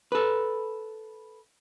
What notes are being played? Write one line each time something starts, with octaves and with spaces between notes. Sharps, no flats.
A4 B4